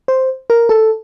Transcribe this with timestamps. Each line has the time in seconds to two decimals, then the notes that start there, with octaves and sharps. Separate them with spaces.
0.08 C5
0.50 A#4
0.69 A4